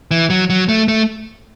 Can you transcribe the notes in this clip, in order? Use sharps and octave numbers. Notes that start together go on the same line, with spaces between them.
E3
F#3
F#3
A3
A3